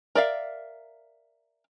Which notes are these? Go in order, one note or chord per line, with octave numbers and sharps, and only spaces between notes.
A#4 D5 E5 F5